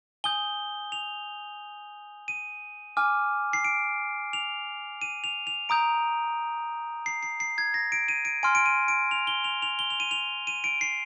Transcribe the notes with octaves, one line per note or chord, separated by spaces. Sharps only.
G#5 D#6 G6 G7
F7
D#7
G#5 D6 F6
C7
D7
F7
D#7
F7
F7
A#5 D#6 G6 D7
C7
C7
C7
G#6
A#6
D7
D#7
D7
G#5 C6 F6 D7
D7
D#7
D7
F7
G7
F7
F7
G7
F7
D#7
F7
D#7
D7
C7